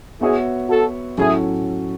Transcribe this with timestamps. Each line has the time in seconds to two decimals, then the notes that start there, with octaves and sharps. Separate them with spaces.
0.21 B3 E4 F#4 G#4 C#5 E5
0.69 F#4 A4
1.18 A2 F#3 C#4 E4 F#4 G#4 A4